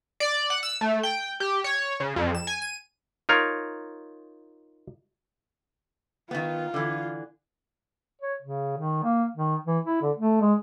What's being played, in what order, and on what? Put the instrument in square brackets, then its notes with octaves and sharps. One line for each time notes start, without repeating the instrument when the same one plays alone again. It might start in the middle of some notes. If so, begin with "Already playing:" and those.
[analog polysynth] D5
F#5
E6
A3
G5
G4
C#5
C#3
F2
E7
G#5
D#7
[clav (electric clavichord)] D#4 F4 A#4 C#5
[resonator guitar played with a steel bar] D#3 B3 [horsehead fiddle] F4
[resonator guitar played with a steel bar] D3 E3
[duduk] C#5
C#3
D#3
A#3
D#3
E3
E4
D3
A3
G#3